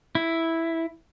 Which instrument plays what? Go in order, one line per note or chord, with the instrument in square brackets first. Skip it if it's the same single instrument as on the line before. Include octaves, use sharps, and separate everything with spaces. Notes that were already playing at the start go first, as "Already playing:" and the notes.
[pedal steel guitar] E4